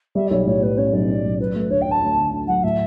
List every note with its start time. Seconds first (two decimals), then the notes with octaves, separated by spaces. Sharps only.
0.15 G3 E5
0.27 D5
0.31 B1 C#5
0.46 A2 C#5
0.62 A2 B4
0.77 C#4 C#5
0.93 B1 D5
1.08 C#4
1.24 B1
1.39 F#3 B4
1.55 A3
1.70 D2 C#5
1.81 G5
1.86 D2
1.91 A5
2.02 D2
2.17 D3
2.32 D3
2.47 F#3 F#5
2.63 A2 E5